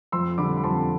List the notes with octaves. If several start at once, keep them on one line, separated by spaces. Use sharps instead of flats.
F2 C6 E6
D3 G3 B5 D6
B5
F2 A5 C6